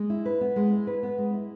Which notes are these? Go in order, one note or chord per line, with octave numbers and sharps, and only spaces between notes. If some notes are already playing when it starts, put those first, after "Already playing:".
Already playing: G#3
E4
B4
B3
G#3
E4
B4
B3
G#3
E4